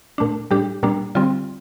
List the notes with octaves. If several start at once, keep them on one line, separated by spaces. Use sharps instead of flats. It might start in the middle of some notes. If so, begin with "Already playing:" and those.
A#2 A3 D4
A2 G3 D4 G4
A#2 G3 A#3 D4
D3 G3 C4 F4